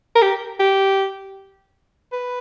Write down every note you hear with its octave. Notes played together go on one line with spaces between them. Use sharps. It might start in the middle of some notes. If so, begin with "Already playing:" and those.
A#4
G4
G4
B4